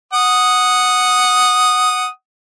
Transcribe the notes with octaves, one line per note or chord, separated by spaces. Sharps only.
F#5 D#6